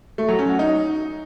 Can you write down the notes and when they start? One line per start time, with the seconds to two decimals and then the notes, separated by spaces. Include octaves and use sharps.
0.18 A3
0.28 F#3
0.39 C#4
0.49 F#4
0.59 D#4